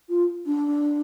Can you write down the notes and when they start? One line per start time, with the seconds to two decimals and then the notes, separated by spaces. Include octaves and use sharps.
0.09 F4
0.46 D4